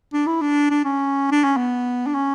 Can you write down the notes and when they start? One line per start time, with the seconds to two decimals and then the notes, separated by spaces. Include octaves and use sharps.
0.13 D4
0.26 E4
0.41 D4
0.70 D4
0.84 C#4
1.31 D4
1.44 C#4
1.57 B3
2.07 D4
2.14 C#4